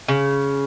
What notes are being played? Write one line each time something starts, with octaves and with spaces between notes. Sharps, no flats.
C#3